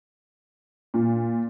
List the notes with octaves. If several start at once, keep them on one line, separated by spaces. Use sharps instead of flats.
A#2